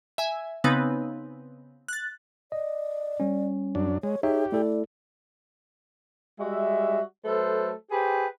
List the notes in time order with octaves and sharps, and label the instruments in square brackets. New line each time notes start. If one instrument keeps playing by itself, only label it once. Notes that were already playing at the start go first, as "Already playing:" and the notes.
[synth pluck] E5 G#5
C#3 B3 C4 D#4 B4
F#6 A6
[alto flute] D5 [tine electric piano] D#5
[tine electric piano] G3 C#4
[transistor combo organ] F#2 D4
[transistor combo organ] G#3 [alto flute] C#5
[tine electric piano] D#4 C#5 E5 [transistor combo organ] G4 [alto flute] G#4
[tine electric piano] A3 E4 A4 [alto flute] D5
[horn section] G3 G#3 F#4 E5
F#3 A3 A4 B4 C5
G4 G#4 B4 C5 G5